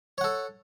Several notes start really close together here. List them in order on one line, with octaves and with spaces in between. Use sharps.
C#5 F#5 A4